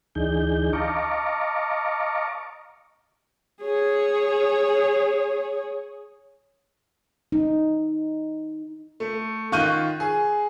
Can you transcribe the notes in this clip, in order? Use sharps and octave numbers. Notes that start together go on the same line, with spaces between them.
D2 E3 D4 D#4 G#4 G6
D#5 F5 A5 A#5 C#6 D6
G#4 C#5
D#4
A3
D#3 F4 C#6 F#6 G6 D#7
G#4